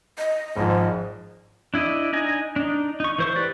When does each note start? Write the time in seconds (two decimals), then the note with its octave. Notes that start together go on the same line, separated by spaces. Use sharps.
0.18 D#5
0.56 G#1 G#2 F3
1.74 D4 E4 D5 D#5
2.13 D4 D#4 D#5 G#5
2.56 D4 D#4
3.00 D#4 C#6
3.18 E3 C5 C#6
3.36 G4 B4 D5